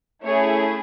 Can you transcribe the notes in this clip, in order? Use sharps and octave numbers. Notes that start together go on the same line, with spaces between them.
A3 C#4 E4 G#4 C#5